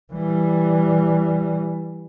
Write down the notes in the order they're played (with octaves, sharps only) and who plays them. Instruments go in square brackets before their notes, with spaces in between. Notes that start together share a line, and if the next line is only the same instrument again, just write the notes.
[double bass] E3 G3